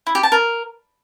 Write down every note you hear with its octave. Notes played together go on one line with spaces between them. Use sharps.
E4
G4
A5
A#4